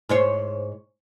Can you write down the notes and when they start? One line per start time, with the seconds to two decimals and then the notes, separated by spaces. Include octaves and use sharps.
0.09 G#2 C5 C#5